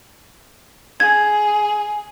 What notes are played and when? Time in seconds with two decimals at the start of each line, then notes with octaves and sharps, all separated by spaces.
1.00 G#4 G#6